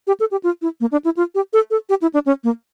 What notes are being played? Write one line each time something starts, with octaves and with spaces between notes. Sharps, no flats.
G4
A4
G4
F4
E4
A#3
D4
E4
F4
G4
A4
A4
G4
E4
D4
C#4
A#3